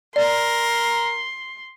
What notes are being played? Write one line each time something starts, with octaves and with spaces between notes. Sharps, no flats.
A#4 D5 C6